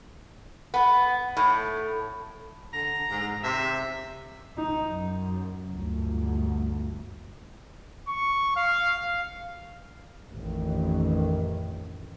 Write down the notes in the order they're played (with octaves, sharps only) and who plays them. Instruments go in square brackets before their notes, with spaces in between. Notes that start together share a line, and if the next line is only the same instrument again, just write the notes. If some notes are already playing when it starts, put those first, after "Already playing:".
[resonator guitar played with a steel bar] B3
A2
[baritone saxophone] D3 [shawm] A#5
[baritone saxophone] G#2
[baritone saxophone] C3 [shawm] E5
[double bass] D#4
F#2
G1 D2
[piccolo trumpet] C#6
F5
F5
[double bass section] A1 F2 D#3